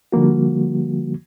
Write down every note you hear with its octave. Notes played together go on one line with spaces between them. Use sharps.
D3 F3 G3 A#3 F#4